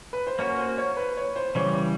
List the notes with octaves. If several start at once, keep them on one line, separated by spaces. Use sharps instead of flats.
B4
C5
A#3 C#4 F#4 C#5
C5
C#5
B4
C#5
C5
C#3 E3 G3 C#5